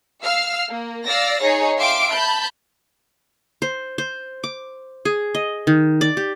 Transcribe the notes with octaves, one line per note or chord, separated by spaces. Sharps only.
F5 E6 F6
A#3
D5 F5 E6 A6 A#6
D#4 G#4 C#5
E5 F5 G5 C6 D6 D7
A5 B5 G6
C5
C5
D6
G#4
D#5
D#3
D5
G4